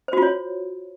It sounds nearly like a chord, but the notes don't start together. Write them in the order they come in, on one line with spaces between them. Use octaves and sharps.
C5 F#4 F4 C#5